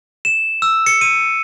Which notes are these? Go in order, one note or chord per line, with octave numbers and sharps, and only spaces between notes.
E7
E6
C#7
D#7